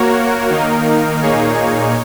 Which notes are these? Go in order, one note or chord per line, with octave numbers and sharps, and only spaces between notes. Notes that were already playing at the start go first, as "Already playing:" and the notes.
Already playing: A#3 F#4 A#4 C#5
D#3 A#3 D#4 A#4
A#2 A#3 D#4 G#4 C#5